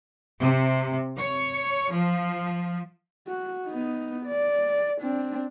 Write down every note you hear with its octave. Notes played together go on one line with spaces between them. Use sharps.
C3
C#5
F3
F#4
B3 D#4
D5
C4 D4